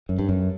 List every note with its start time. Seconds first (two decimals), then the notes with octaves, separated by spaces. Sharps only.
0.09 F#2
0.19 G2
0.29 F#2